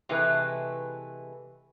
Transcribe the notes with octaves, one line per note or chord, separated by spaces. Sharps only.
C3 E3 G#3 A3 B4